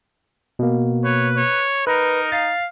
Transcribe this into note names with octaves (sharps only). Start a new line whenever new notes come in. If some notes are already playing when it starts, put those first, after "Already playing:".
B2 A#3
B4 C#5
C#5
D#4 A#4 B4
F5 A6